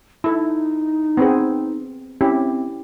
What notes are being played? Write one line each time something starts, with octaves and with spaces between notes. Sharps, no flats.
D#4 E4 A4
B3 C4 G#4
C4 C#4 E4 G4